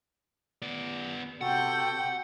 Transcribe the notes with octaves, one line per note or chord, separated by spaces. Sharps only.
B3 D5
C3 F#4 A4 F#5 G5 G6